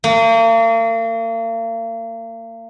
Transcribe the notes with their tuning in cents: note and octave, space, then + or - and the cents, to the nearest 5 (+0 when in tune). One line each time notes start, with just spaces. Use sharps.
A#3 -40